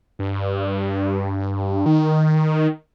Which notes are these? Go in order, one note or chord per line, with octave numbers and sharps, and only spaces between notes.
G2
D#3